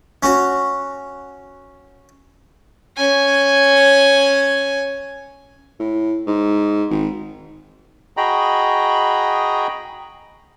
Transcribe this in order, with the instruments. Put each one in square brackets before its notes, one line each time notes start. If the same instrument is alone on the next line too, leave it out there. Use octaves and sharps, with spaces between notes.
[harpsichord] C#4 F#4
[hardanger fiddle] C#4 G#5
[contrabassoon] A2
G#2
G#1
[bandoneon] F#4 G#4 D#5 G5 A#5 B5